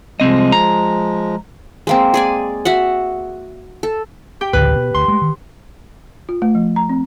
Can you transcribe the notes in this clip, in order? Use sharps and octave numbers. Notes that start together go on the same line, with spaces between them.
C2 F3 G#3 C4 D#5
A#5
G#3 A#3 C4
G#4 D5 G#5
F#4 E5 F#5
A4
G4 G5
A1 D2 C#3 B4
B2
D2 C6
G#3 A3
D#3
F4
A3
F3
A#5
C4